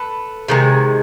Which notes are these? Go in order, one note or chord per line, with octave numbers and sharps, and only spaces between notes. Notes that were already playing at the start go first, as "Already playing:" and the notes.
Already playing: A4 B4
C3 D#3 G#3